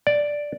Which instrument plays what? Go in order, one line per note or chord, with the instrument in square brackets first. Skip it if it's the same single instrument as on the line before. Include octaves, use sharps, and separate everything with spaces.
[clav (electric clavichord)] D5